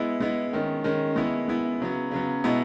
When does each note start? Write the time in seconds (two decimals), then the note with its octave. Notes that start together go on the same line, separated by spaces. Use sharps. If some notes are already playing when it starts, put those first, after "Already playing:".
Already playing: G#3 B3 E4
0.20 G#3 B3 E4
0.53 D#3 G#3 C#4
0.84 D#3 G#3 C#4
1.16 G#3 B3 E4
1.48 G#3 B3 E4
1.80 C#3 F#3 B3
2.11 C#3 F#3 B3
2.44 B2 G#3 B3 E4